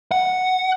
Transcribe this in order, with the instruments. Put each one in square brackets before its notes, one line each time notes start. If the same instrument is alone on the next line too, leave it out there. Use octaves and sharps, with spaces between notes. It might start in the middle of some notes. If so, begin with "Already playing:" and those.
[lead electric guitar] F#5